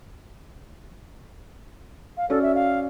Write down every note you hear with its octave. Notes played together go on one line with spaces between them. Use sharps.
F5
C#4 F#4 A4 D5
E5
F5